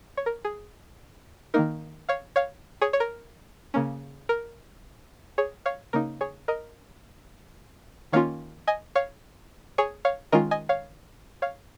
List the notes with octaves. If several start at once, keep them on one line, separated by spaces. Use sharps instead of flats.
C#5
A#4
G#4
D#3 A#3 D#4 A#4
C#5 F5
C#5 F5
G#4 C#5
C#5
A#4
C#3 A#3 C#4
A#4
G#4 C#5
C#5 F5
C#3 A#3 D#4 A#4
G#4 C#5
A#4 D#5
D#3 A#3 C#4 F4 C#5 F5
D#5 G#5
C#5 F5
G#4 C#5
C#5 F5
D#3 G#3 C#4 F4 A#4 D#5
D#5 G#5
C#5 F5
C#5 F5